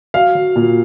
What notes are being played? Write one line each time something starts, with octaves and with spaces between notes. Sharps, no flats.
F#3 F5
F#3
A#2